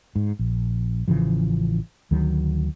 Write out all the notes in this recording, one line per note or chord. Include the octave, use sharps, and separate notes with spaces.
G#2
A#1
A1 C#3 E3 F3
D2 D#3 F#3